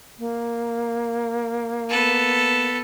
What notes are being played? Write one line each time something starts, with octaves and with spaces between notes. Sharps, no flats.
A#3
B3 A4